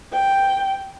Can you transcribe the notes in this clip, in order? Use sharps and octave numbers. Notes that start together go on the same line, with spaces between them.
G5